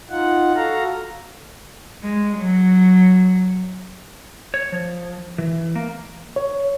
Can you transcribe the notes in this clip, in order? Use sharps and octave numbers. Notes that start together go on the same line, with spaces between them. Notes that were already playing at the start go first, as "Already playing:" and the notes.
D#4 F4 F#5
F#4 A4 F5 A#5
G#3
F#3
C#5
F3
E3
A#3
C#5